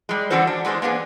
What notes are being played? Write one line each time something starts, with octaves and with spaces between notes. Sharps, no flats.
G3 G#3
D3 E3 C#4 F#4 A4 C5
D4
E2 G#3 D4 G#4 C5
A#3 B3 D4 G#4